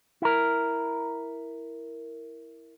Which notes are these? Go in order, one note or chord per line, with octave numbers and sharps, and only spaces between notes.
E4 A#4